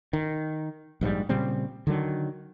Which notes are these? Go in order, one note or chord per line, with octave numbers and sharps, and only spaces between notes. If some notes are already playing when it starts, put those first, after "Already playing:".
D#3
A#1 G#2 B2 G3
A#2 C#3 G3 C4
D3 D#3 F#3